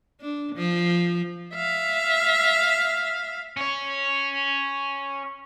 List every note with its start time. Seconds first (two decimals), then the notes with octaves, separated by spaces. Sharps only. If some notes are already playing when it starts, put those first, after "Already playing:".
0.21 D4
0.56 F3
1.54 E5 F5
3.57 C#4 C#5